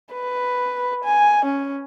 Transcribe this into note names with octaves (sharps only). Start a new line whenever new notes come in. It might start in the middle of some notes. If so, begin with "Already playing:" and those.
B4
G#5
C#4